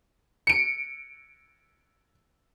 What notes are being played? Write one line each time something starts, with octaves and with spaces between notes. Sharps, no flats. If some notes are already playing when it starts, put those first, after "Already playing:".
C#7 D7